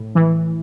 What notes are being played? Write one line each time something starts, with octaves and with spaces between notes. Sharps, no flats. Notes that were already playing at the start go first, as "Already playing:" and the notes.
Already playing: A2
E3